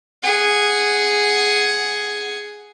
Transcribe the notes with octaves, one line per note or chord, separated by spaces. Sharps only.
G#4 F#5